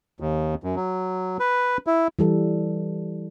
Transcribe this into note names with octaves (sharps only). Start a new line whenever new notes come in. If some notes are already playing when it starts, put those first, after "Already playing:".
D#2
F#2
F#3
B4
E4
E3 G3 A4